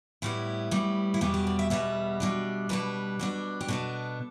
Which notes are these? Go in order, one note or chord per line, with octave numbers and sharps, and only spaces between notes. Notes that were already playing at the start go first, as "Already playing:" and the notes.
A2 G3 B3 E4
A2 G3 B3
E4
E2 B2 G3 B3 G4
G4
D5
E5
E2 B2 G3 B3 E5
B2 G3 D4
B2 G3 D4 B4
B2 B3 D4
G4
B2 B3 D4 A4